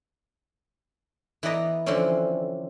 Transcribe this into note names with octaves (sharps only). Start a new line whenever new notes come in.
E3 B3 B4 D5 D#5 A#5
D3 E3 F3 C4 C#4